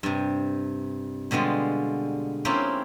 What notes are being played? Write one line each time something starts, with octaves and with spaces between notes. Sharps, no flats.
G2 C3
B2 D3 G3 G#3 F4
A#3 C4 C#4 E4 F4 G4